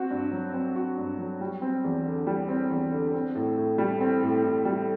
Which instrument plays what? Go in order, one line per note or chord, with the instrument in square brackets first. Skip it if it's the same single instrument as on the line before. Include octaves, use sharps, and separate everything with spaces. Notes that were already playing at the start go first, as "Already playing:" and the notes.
Already playing: [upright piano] C4 F#4
G2
F#3
C4
F#4
G2
F#3
G3
C4
E2
D3
G3
C4
E2
D3
C4
A2
A2
G3
C4
A2
A2
G3